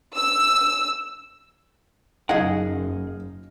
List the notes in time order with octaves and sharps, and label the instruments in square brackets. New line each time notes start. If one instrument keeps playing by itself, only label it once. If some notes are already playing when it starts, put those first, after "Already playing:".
[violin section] E6
[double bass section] F#1 F#2 [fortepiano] D#4 D#5 G#5 [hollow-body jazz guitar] G#4 F#5 [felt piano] F5